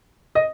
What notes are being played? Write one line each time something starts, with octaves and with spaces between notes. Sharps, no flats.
D#5